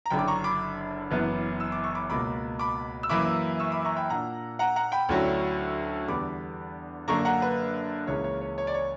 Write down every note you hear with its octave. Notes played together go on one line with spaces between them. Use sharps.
A#5
F#1 F#2 D3 G5 B5
D6
A#5 C#6
B5 D6
F#1 F#2 E3 B3
E6
D6
C#6
B5 D6
C#2 B2 A#3 B5 D6
B5 D6
E6
F#2 E3 A#3 E4 B5 D6
C#6 E6
B5 D6
A#5 C#6
G5 B5
A#2 A#3 D4 F#5 A#5
F#5 A#5
F#5 A#5
G5 B5
D2 D3 F#3 C#4 E4
E2 D3 G3 B3 B5 D6
F#2 D3 A#3 A#5 C#6
F#5 A#5
B4
C#2 C#3 E3 A#3 C#4 C#5
C#5
C#5
C#5
D5
C#5